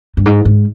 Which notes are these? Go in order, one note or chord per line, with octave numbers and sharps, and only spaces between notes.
G2
G#2
G#2